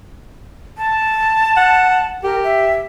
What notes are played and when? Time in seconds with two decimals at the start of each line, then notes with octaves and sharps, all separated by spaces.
0.78 A5
1.57 F#5
2.23 G4 A#4
2.44 E5